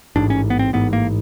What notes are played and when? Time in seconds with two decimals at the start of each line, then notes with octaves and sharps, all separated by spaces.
0.16 A1 G#2 D4
0.30 C#4
0.50 B3
0.59 C4
0.73 A1 G#2 B3
0.93 A#3